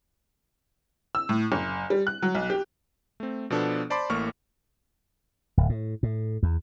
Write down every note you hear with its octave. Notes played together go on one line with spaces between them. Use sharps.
E6
A2
F#1
G3
F#6
F#3
B1
G4
A3 C4
B2 F3 B3 D4 A4
C5 D5 A5 B5 C6 D6
A1 A2 A#3 C#6 F6
D1
A2
A2
E2